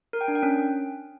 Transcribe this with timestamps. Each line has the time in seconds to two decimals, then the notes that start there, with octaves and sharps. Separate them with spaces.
0.13 A#4
0.21 G5
0.28 D4
0.35 G5
0.43 C#4